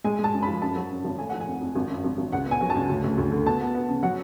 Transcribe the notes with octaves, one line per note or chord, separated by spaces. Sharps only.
G#3 G#5
G#3
A5
F#2
F3 B5
F#2 A5
F#3
F#2
G#1
A3 G#5
F3 F#5
G#5
F2
F2
G#1
F#2
G#1
G#1
C#2 F#5
B3
G#5
F#3
A5
C#2
D2
D2
D2
D3
B3 A5
B3
B3
C#3
F#3 F#5